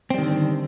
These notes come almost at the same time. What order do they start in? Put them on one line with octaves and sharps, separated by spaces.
C4 G3 D#3 D3